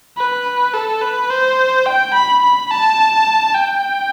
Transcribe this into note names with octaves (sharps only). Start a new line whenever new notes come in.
B4
A4
B4
C5
G5
B5
B5
A5
G5